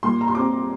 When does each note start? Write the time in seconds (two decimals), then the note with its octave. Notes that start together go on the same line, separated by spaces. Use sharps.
0.03 A#2 C6
0.21 A#5
0.28 C6
0.35 C4 D6